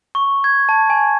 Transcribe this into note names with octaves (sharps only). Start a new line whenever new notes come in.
C#6
G#6
A5
G#5